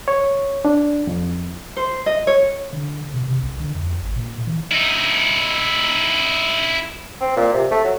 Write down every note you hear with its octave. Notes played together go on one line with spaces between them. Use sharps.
C#5
D4
F2
C5
D#5
C#5
D3
B2
C3
C2
D3
F2
G#1
A#2
E3
D#4 E4
C4
A#2
C3
A3
F#3